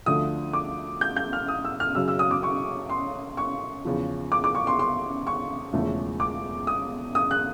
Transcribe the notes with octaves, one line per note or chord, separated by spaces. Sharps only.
D2 D3 F3 A3 D#6
D6
G6
G6
F6
D#6
E6
F6
F#2 C#3 F#3 E6
E6
D#6
D6
C#6
C6
C#6
E2 C#3 F3
D6
D6
C#6
C6
C6
C#6
E1 E2 C#3 F3 A3
D6
D#6
D#6
F#6